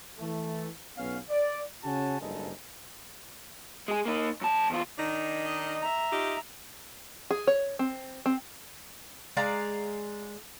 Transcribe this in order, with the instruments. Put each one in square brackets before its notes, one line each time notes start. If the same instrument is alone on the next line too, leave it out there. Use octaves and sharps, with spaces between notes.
[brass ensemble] E3 A3
B1 B3 C#4 F5
D5
C#3 C#4 F#4 G#5 A5
F#1 G2 G#3 D#4 A4
[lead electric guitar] G#3 G#4
A#3 D#4
F#2 A5
E2 F4
[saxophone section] D#3 D4 D#4
[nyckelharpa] D#5
E5 A#5
[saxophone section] D#4 F4 G4
[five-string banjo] G#4
C#5
C4
C4
[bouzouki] G#3 D5 F5 A#5